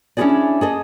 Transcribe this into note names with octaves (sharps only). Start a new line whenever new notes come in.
C#4 D4 E4 F#4 G#4 D5
G#4 A4 D#5